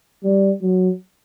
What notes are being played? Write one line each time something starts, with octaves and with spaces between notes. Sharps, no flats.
G3
F#3